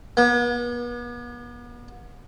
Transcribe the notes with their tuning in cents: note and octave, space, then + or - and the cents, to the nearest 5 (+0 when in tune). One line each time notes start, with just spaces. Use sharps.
B3 -40